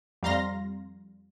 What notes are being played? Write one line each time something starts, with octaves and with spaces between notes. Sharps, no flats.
F2 G3 F5 A#5 C6 A#6